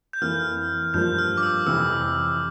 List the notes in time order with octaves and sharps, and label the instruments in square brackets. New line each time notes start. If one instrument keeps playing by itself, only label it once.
[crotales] G6
[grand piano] F2 E3 A#3 E4 [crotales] F6
[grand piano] G2 F3 A#3 F4 [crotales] G6
[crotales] F6
D6
E6
[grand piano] F2 C3 E3 [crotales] E6